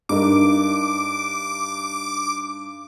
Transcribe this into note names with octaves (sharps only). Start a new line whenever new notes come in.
G2 D#4 A#4 D6